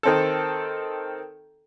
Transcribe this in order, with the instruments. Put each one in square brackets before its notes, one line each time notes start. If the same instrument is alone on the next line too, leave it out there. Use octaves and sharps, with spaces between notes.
[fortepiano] D#3 C4 A4